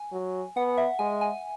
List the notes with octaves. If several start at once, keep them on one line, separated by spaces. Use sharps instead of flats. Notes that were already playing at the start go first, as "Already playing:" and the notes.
Already playing: G#5
F#3
B3 F#5
E5
G#3 G#5
G#5